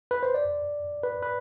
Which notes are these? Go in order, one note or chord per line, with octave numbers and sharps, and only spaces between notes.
B4
C5
D5
B4
B4